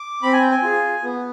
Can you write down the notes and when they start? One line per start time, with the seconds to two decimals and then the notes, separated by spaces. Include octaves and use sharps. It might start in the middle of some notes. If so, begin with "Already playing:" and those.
Already playing: D6
0.23 C4 B5
0.33 G#5
0.42 G5
0.51 G#5
0.63 F4 G#4
1.03 B3